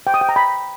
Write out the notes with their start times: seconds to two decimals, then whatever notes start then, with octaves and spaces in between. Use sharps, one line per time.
0.07 G5
0.14 D#6
0.21 G5
0.29 A#5
0.36 B5